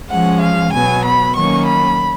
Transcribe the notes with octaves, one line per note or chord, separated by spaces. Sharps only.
F3 G#3 C#4 F#5
F5
B2 F#3 B3 G#5
B5
D#3 F#3 A#3 C#4 C#6
B5